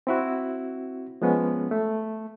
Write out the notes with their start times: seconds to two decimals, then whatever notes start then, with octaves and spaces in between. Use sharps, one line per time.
0.07 C4 E4 F#4
1.22 F3 G#3 B3 C#4
1.71 A3